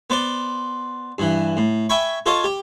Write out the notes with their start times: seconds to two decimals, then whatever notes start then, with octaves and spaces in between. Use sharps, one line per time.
0.10 B3 C5 D5 C6
1.18 G2 E3
1.57 A2
1.89 E5 G5 G#5 B5 C#6
2.26 F4 A4 C#5 D#5 F5
2.44 G4